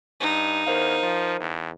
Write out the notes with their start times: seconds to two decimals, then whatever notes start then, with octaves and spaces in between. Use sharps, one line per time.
0.21 G2 D#4
0.67 E2 A#4 C5 F5
1.03 F3
1.40 E2